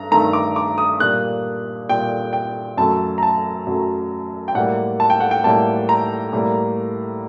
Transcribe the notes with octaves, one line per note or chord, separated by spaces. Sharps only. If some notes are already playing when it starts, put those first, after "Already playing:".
Already playing: G2 A#5
G2 D#3 A3 A#5
D6
D6
D#6
A#2 G3 A#3 F#6
A#2 G3 A#3 G5
G5
F#2 F#3 A3 A5
A#5
A5
F#2 F#3 A3
G5
A2 G3 A#3 F#5
A5
G5
F#5
G5
A2 G3 A#3 A5
A#5
A2 G3 A#3